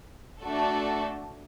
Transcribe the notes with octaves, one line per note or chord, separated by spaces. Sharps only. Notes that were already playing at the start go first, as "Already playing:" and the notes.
A3 D4 F#4 A4